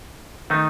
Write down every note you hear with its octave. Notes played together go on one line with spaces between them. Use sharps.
D#3 A3 D#4